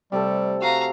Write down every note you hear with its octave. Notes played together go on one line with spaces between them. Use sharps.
C3 G3 A3 A4
F#4 F5 A#5